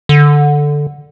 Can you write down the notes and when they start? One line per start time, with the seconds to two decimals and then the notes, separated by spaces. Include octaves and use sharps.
0.09 D3